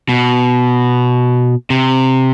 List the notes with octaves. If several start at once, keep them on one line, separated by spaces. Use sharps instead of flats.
B2
C3